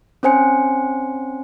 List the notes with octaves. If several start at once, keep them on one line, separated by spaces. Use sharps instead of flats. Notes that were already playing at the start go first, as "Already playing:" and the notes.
C4 C#4 C5 G#5 C#7